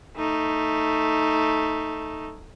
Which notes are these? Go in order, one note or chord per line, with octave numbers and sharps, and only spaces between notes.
A3 D#4